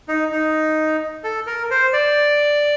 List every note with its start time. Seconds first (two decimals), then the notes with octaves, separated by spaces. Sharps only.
0.08 D#4
0.32 D#4
1.24 A4
1.47 A#4
1.71 C5
1.93 D5